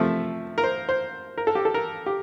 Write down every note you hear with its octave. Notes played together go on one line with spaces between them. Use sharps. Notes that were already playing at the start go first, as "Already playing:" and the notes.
Already playing: C3 F3 A3 E5
A#4
C5
C5
A#4
A4
G4
A4
A#4
G4